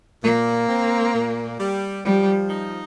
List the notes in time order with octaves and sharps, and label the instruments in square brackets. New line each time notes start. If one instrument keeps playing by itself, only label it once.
[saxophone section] A#2 [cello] A#3
[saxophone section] C4
A#2
G3
[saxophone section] F3 [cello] G3
[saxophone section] D#4